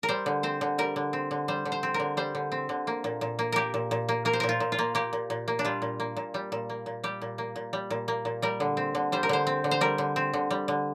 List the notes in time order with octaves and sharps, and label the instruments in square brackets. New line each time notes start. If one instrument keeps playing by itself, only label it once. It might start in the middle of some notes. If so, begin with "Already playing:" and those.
[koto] A#4
G3 C5
D3
C4 C5
D3
G3 A#4
D3
C4
D3
G3 C5
D3
C5
C4
A#4
D3
G3 C5
D3
C4
D3
A#3
A#2
A#2
A#3
A#3 G4 A#4
A#2
A#2
A#3
A#3 A#4
C5
A#2 A#4
F4
A#2
F4
A#3
A#3 G4
A#2
A#2
A#3
D4
G3 F4
A#2
A#3
A#2
G3
A#2
A#3
A#2
G3 G4
A#2
A#3
A#2
G3
A#2
A#3
A#2
G3 A#4
D3
C4
D3
G3 C5
A#4
D3 C5
C4
D3
C5
G3 A#4
D3
C4
D3
G3
D3